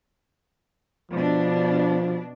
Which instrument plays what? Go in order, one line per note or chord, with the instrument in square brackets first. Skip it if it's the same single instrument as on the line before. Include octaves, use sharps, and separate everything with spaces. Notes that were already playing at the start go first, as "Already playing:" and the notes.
[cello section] B2 D4 [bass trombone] F3